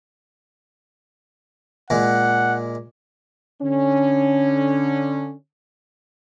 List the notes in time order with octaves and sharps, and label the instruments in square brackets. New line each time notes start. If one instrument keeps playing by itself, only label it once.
[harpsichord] A#2 G#3 [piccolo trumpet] F#5
[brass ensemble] D3 C#4